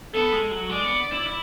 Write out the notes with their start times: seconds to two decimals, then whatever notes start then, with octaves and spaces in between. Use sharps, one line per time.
0.14 B3 A4
0.33 G#3
0.51 F#3
0.69 G#3 D5
0.84 B3
1.12 E4
1.26 E4